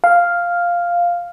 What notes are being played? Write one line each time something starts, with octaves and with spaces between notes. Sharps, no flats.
F5